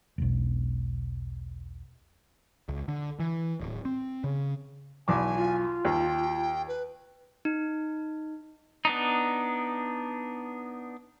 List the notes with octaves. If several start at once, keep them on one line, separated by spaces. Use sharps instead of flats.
E1 B1
C#2
D3
E3
D1
C4
C#3
B1 E2 G#5 D6
F4
D#2 G5
B4
D#4
B3 D4 D#4